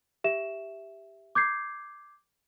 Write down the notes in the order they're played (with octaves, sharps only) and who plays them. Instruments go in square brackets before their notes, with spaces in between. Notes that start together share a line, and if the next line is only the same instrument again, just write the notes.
[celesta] G4 E5 E7
D6 G6 G#6 C7